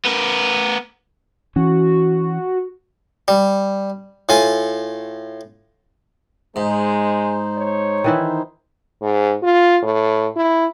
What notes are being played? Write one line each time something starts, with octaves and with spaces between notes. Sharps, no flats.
B3 A#4
E3 C#4 F#4
G3
A2 F4 G#5
G#2 G#3 D#4 C5
C#5
D#3 E3 E4
G#2
F4
A2
E4